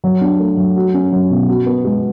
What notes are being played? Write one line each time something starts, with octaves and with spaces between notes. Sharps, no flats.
F#3
D4
A3
F#3
F#4
C#4
F#3
B2
F#4
B3
G#3